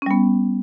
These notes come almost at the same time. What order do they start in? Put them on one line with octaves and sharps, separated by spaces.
C#4 G3 B3